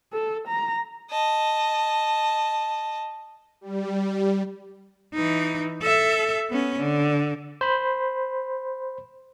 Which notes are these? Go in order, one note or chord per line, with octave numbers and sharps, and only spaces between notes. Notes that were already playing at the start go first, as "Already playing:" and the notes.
A4
A#5
D#5 A5
G3
E3 D#4
A4 E5
B3 C#4
D3
C5 B5